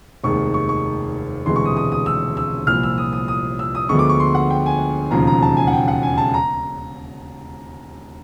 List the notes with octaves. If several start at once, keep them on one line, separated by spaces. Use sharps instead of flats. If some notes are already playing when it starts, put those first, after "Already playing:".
F1 D#2 D#3 G#3 C#6
C#6
C#6
E1 D2 C3 E3 G#3 C6
C#6
D#6
D#6
D#6
E6
E6
C2 A#2 F3 F6
E6
D#6
D#6
D#6
E6
D#6
D2 D3 F3 G#3 B3 C#6
D6
C#6
C6
F#5
G5
G#5
E1 D#2 C#3 F3 A#5
A#5
A5
G#5
F#5
G5
F#5
G#5
A5
A#5